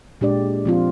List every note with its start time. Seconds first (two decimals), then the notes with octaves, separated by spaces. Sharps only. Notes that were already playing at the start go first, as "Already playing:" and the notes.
0.21 A#2 G#3 D4 G4 D5
0.65 F3 C4 F4